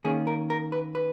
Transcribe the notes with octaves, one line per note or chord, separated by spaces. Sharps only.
D#3 A#3 C#4 G#4
A#4
A#4
B4
B4